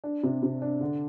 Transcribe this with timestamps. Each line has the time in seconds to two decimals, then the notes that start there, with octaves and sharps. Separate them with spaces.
0.04 D4
0.23 C3
0.43 C3
0.62 D4
0.81 D3